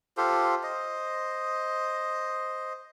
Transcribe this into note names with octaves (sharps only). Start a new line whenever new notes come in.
F4 G4 A4 C5
C5 D#5